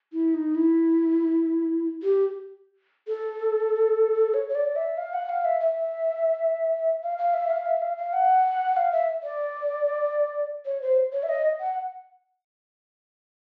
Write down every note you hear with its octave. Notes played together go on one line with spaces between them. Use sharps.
E4
D#4
E4
G4
A4
C#5
C#5
D5
E5
F5
F#5
F5
E5
E5
F5
F5
E5
F5
E5
F5
F5
F#5
F5
E5
D5
C#5
C5
C#5
E5
D#5
F#5